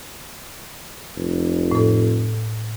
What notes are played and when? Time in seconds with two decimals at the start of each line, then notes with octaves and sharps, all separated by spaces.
1.16 F1
1.71 A2 A4